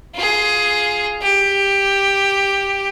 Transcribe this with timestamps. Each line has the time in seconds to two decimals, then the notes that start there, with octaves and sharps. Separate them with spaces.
0.15 F4 G#4
1.22 G4